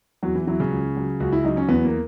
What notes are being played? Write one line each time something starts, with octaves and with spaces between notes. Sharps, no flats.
E2 F#3 F#4
E3 E4
E3 F#3 E4
C#3 C#4
C#2
F#3
C#2 F#4
E4
F#3 D#4
C#4
E2 B3
A#3